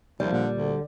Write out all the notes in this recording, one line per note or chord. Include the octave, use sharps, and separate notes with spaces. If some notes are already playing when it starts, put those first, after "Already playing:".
D#2 F3 G3
A#2 D3
D2 D3